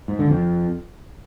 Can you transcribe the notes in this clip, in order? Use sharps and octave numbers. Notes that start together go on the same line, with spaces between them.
G#2
D3
F2